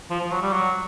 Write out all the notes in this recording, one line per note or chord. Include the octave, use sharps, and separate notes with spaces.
F3
F3
F#3
G3
F#3